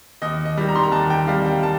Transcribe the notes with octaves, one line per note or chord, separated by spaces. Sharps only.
D#2 D#5
D#5
D#3 G3
A#5
C6
A#5
D#2 A5
G5
D#3 G3 F5
G5
A5